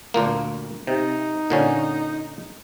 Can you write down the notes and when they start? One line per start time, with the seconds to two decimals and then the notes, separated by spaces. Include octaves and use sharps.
0.14 D2 A#2 A#3
0.87 C3 D#4
1.50 A#2 D3 C#4